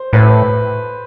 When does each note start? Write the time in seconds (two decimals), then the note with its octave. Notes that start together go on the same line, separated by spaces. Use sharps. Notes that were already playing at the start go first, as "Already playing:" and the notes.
Already playing: C5
0.13 A2 B4